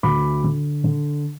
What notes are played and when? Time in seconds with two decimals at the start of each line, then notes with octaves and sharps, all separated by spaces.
0.03 D2 B5 D6
0.44 D3
0.84 D3